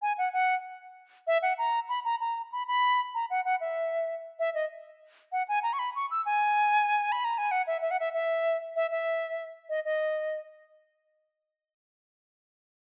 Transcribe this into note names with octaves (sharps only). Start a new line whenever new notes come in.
G#5
F#5
F#5
E5
F#5
A#5
B5
A#5
A#5
B5
B5
A#5
F#5
F#5
E5
E5
D#5
F#5
G#5
A#5
C#6
B5
C#6
E6
G#5
B5
A#5
G#5
F#5
E5
E5
F#5
E5
E5
E5
E5
D#5
D#5